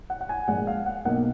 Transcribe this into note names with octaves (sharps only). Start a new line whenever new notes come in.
F#5
F#5
G#5
A#1 A#2 G#3 F#5
F5
F#5
B1 B2 A#3 F#5